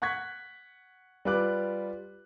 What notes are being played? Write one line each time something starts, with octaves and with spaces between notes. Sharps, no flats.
F#5 C#6 F#6 G#6 B6
G3 F4 B4 D6 F#6